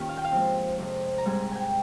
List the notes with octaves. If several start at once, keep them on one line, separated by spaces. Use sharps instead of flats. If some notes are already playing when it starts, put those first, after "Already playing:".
Already playing: A#2 D#3 A#3 C#4 F4 G4 C#5
F5
G5
F5
G#2 F3 C4
F2 C3 F3
A#5
G#2 G3 C4 G#5
G5 G#5